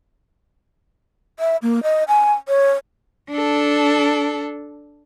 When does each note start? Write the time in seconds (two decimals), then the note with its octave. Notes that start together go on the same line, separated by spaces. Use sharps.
1.39 E5
1.62 A#3
1.83 D#5
2.08 G#5
2.48 C#5
3.30 D4 A4